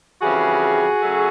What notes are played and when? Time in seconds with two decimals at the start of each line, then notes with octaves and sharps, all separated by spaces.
0.22 F2 C#3 E3 G3 F#4 G#4
1.02 C#3 F#3 A3